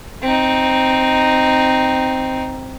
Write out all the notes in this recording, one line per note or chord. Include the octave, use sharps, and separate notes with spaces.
C4 D#4